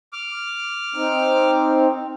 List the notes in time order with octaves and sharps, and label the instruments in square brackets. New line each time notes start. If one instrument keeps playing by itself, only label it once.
[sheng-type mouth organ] D6 F6
[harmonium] C4 D#4